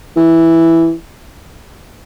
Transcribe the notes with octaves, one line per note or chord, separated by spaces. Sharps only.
E3